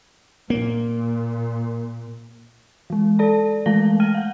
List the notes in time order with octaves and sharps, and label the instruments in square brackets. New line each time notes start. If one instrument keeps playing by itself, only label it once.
[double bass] A#2 [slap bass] A#3
[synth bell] E3 G#3
A4 D5 A5
E3 G#3 A3 F5 A#6 G7
G5 F6 D#7
F5 F#5